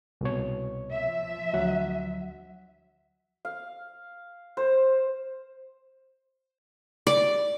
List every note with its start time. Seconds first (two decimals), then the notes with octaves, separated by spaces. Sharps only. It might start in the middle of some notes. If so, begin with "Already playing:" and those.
0.21 C2 B2 C#5
0.91 F3 E5
1.54 D2 F#3 F#5
3.45 F5
4.57 C5
7.07 D5